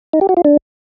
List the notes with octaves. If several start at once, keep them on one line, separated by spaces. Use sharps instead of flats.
D#4
G4
F#4
F4
D4